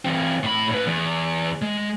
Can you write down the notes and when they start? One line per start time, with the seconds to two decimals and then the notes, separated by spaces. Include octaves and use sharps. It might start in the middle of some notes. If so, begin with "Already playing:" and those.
0.05 E3 C4
0.43 A2 B5
0.71 A2 B4
0.87 E2
1.62 G#3